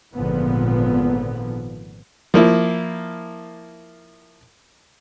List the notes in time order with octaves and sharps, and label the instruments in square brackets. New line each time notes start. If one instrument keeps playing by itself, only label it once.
[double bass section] G#1 A#2 D3 F3 B3
[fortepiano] F3 A#3 E4